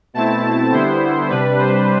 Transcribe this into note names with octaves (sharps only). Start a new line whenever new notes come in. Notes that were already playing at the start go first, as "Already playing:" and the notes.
B2 A3 C4 E4 A5
D3 G3 B3 E4 C5
C3 G3 D4 B4
C5